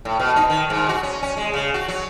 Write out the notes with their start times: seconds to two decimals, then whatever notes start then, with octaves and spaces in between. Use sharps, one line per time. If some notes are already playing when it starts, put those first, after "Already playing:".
0.05 A2
0.19 B2
0.36 D#4
0.50 D#3
0.70 G#2
0.89 F#4
1.03 C#4
1.23 C#4
1.37 G#3
1.54 C#3
1.74 F#4
1.88 F#3